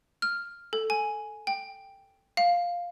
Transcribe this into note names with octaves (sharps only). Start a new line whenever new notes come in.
F6
A4
G#5
G5
F5